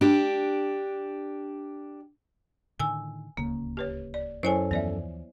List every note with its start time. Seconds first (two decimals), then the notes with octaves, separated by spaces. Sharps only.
0.01 D4 G4
2.80 A2 D3 D#3 G#5 E6
3.37 D1 C#2 C#3 A#3
3.77 G4 B4 C#5
4.14 D5
4.43 F#2 F#3 E4 A4 C5 C#5 G#5
4.71 D#2 E3 F3 B3 D5 E5